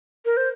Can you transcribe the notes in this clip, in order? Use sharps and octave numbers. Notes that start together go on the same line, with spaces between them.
A#4
C5